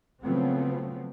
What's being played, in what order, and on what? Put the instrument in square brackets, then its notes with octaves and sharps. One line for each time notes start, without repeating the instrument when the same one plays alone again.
[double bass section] C#3 F3 F#3 A3 B3 C4